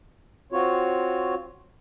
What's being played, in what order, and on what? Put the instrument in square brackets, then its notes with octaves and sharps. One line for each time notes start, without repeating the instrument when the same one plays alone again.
[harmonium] C4 F4 F#4 C#5